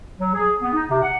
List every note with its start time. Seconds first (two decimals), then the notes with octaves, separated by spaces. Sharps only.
0.20 F#3
0.34 G#4
0.62 B3
0.74 D#4
0.90 C3
1.02 F#5